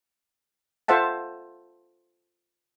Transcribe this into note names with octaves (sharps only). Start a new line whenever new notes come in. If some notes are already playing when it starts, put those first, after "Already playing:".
F4 A4 C5 E5 F#5 A5